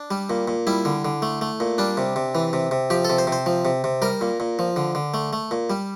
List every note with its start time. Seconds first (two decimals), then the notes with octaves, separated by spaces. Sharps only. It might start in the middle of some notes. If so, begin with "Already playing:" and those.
Already playing: D4
0.11 G3
0.30 A#2
0.48 A#2
0.67 G3 E4
0.85 D3
1.05 D3
1.22 A3
1.41 A3
1.60 A#2
1.78 G3 D4
1.97 C3
2.16 C3
2.35 E3
2.53 C3
2.71 C3
2.90 F3 G4
3.05 A4
3.10 C3
3.18 C5
3.27 C3
3.32 C5
3.46 F3
3.65 C3
3.84 C3
4.02 G3 A#4
4.21 A#2
4.40 A#2
4.59 F3
4.76 D3
4.95 D3
5.14 A3
5.33 A3
5.51 A#2
5.70 G3